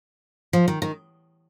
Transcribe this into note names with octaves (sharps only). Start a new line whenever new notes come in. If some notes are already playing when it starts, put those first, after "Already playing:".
F3
D#3
D#3